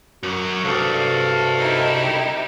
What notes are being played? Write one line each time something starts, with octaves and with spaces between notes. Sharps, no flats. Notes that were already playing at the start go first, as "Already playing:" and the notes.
F#2 F#3 F#4
C2 G2 A4 F5
D#4 E4 G4